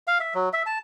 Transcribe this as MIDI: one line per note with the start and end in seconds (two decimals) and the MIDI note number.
0.07 0.18 77
0.20 0.34 76
0.34 0.49 54
0.53 0.62 76
0.66 0.78 81